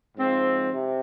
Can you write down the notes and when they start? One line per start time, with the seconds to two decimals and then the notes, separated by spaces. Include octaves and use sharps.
0.17 G#2 F3 C4
0.71 C3